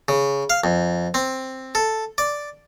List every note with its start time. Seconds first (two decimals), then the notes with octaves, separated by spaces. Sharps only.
0.08 C#3
0.50 F5
0.64 F2
1.14 C4
1.75 A4
2.18 D5